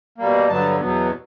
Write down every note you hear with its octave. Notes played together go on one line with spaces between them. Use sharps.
B2 G3 A#3
G2 D3 F#3 B3 A5
E2 B2 F#3 B3